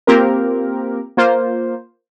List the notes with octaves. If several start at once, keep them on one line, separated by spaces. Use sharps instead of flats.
A#3 C4 F4 G4 A#4
A#3 F4 C5